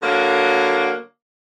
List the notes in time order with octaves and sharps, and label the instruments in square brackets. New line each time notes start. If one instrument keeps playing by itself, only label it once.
[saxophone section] D3 F#3 A#3